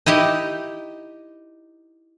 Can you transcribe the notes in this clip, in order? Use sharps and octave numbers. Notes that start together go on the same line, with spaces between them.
D#4 E4 G4 D#5